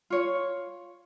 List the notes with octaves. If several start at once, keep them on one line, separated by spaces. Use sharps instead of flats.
F4 C#5